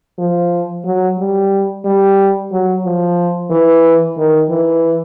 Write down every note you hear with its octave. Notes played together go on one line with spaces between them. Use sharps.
F3
F#3
G3
G3
F#3
F3
E3
D#3
E3